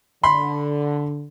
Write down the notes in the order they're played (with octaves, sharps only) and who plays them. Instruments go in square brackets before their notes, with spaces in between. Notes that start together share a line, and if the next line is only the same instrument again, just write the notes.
[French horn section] D3 [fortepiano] B5 C6